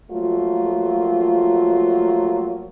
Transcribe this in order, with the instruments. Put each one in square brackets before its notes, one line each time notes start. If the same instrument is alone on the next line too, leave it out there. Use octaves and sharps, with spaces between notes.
[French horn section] F3 F#3 A3 A#3 F4